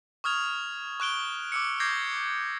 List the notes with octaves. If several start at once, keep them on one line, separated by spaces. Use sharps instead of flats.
C#6 D#6 F6 G#6 F7
C#6 F#6 D7 G7
D6 E6 C#7
D6 G6 G#6 A#6 C7